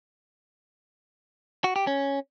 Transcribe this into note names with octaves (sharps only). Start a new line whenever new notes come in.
F#4
G4
C#4